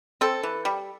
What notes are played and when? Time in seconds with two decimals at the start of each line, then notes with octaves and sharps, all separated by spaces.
0.21 C4 A4
0.43 E3
0.65 G3